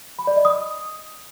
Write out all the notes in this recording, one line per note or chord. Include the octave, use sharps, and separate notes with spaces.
B5
D5
D#5
D#6